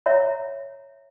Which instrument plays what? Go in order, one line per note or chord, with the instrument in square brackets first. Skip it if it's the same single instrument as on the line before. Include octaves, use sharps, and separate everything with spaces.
[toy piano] C#5 E5 F#5 A#5